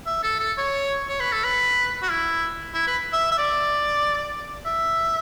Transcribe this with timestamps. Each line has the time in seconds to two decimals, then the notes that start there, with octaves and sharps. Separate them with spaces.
0.06 E5
0.23 A4
0.40 A4
0.58 C#5
1.09 C#5
1.20 B4
1.32 A4
1.44 B4
2.02 F#4
2.10 E4
2.74 E4
2.87 B4
3.13 E5
3.32 E5
3.38 D5
4.66 E5